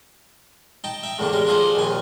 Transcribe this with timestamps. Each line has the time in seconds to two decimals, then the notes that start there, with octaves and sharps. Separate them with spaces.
0.84 D#4 G5 A5
1.03 E5 G5
1.19 E2 A2 D3 A#3 D4
1.33 G3 G#3 A#4
1.47 D4 F4 G#4 A4 C5
1.75 A#1 D#2 A#2 G#5